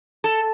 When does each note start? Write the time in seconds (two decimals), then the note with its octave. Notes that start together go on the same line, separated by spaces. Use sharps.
0.24 A4